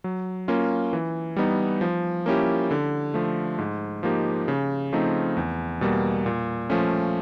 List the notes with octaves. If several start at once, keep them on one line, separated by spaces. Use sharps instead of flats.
F#3
A#3 C#4 F4
E3
G3 B3 D#4
F3
A#3 C#4 E4 G4
D3
F3 A3
G#2
F3 A#3 D#4 G4
C#3
F3 A3 C4 D#4
E2
B2 G3 A#3
A#2
F3 A3 C#4